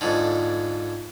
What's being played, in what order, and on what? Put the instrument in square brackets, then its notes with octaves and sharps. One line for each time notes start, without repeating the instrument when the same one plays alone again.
[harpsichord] F2 G#2 D3